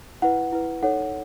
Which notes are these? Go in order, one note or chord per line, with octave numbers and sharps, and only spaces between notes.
E4 B4 F#5
E4 B4
D#4 A4 C#5 F#5